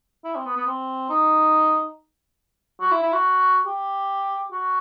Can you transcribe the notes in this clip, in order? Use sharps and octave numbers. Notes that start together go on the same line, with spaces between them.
E4
C4
B3
B3
C4
D#4
F#4
E4
E4
F#4
G4
F#4